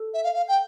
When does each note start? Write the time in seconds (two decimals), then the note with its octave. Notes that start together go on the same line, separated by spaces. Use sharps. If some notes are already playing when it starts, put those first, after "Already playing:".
Already playing: A4
0.14 E5
0.24 F5
0.34 F5
0.48 G5